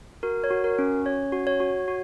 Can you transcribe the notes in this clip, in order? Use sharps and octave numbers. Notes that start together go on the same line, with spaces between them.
F#4 A#4
C#5
F#4
A#4
C#4
C#4 C#5
F#4
C#5
F#4
F#4